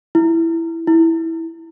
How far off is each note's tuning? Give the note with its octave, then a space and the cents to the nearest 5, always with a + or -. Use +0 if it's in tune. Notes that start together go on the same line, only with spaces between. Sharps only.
E4 +5
E4 -10